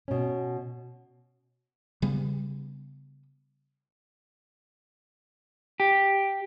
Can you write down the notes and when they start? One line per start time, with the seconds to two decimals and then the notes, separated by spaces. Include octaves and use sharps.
0.08 B2 C#4
2.02 C#3 G3 B3
5.80 G4